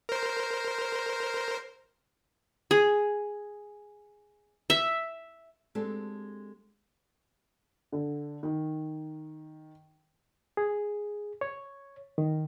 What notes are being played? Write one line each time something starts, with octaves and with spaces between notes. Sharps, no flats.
A#4 C5
G#4
E5
G#3 C4 D4 G4 A4
D3
D#3
G#4
C#5
D#3